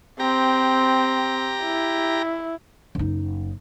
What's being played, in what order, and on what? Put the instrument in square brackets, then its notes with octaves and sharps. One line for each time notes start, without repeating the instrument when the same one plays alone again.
[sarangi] C4 [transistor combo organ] G4 A#5
[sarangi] E4
[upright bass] F#1 D#4